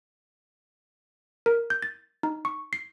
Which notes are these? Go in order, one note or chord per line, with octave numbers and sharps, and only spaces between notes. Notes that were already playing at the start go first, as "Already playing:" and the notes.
A#4
G6
A6
D#4
C#6
C7